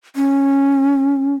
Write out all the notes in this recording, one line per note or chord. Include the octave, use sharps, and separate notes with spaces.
C#4